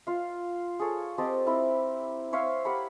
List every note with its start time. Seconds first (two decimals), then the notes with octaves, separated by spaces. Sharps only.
0.07 F4 F5
0.79 G#4 A4 C#5
1.18 C4 G4 D#5 A5
1.46 C4 E4 A#4
2.33 C5 C#5 E5 F5
2.65 G4 A#4 F#5 B5